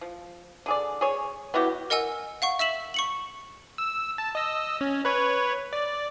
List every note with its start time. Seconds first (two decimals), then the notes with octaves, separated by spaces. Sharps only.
0.01 F3
0.66 D3 G#4 D5
1.01 G#4 C#5
1.54 B3 E4 F#4 G4
1.90 A#4 D#5 F#5 G#5 E6
2.42 F5 F#5 C#6
2.59 E5 E6 B6 E7 F#7
2.94 C#6 C#7 F#7
3.78 E6
4.18 A5
4.35 D#5 E6
4.81 C#4
5.05 B4 C#5
5.73 D5